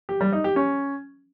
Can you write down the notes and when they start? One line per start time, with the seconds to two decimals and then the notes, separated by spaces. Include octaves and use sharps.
0.09 G4
0.21 G3
0.32 D#4
0.44 G4
0.56 C#4